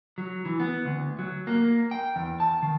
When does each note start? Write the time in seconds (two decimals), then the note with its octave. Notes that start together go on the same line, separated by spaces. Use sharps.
0.18 F#3
0.45 E3
0.60 B3
0.85 D2
1.19 F#3
1.47 A#3
1.91 G5
2.16 E2
2.40 A5
2.63 D#3